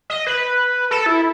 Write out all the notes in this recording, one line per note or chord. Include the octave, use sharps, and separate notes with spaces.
D#5
B4
A4
E4